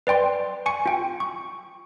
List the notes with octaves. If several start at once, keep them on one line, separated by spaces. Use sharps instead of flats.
B4 D5 G5 C6
G#5 C#6 C#7
F4 G5
C#6